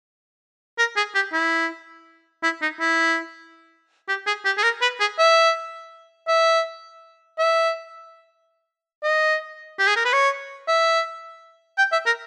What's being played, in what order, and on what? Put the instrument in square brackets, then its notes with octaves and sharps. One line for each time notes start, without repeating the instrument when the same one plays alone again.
[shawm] A#4
G#4
G4
E4
E4
D#4
E4
G4
G#4
G4
G#4
A#4
B4
G#4
E5
E5
E5
D#5
G4
G#4
A#4
B4
C#5
E5
G5
E5
A#4